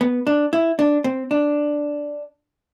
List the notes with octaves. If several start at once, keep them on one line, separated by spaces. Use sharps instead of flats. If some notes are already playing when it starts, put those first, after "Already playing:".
B3
D4
E4
D4
C4
D4